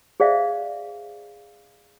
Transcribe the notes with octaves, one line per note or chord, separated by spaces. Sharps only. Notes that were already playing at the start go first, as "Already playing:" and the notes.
G#4 C5 D5 E5 F5